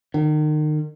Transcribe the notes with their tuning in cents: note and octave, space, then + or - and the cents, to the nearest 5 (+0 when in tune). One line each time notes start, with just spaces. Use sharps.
D#3 -35